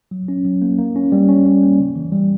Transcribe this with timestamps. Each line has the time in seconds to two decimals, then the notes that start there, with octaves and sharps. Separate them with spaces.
0.11 F#3
0.28 C#4
0.45 F#3
0.62 A#3
0.78 A#3
0.96 C#4
1.12 G3
1.29 C#4
1.45 G3
1.62 A#3
1.79 C#3
1.96 E3
2.12 G3